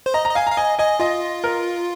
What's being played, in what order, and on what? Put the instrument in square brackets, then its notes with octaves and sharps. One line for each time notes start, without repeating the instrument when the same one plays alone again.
[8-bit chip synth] C5
[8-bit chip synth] D#5 [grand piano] A#5
[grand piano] A#5
[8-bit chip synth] D#5
[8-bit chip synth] F5 [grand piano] G#5
[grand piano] A#5
[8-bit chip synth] F5
[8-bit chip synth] D#5 [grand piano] G#5
[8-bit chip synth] D#5 [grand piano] G#5
[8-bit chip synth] F4 [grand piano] D#5
[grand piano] A#4